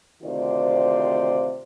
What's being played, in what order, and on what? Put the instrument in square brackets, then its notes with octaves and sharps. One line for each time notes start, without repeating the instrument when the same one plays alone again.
[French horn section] D2 C3 D#3 F4 C5 D5